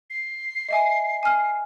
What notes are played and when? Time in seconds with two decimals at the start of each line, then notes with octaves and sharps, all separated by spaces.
0.10 C7
0.69 D#5 E5 G#5
1.23 G#5 F6